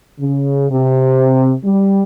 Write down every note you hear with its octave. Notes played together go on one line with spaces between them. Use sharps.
C#3
C3
G3